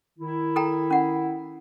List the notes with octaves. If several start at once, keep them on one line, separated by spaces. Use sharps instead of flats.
D#3 E4
A4 G5 A#5
C#4 F#5